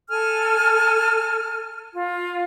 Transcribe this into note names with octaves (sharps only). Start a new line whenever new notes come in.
A4 G#5 F6
F4